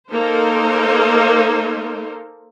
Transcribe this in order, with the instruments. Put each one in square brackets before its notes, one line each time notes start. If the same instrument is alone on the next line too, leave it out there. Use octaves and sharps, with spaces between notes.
[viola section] A#3 D#4 A4 A#4 C5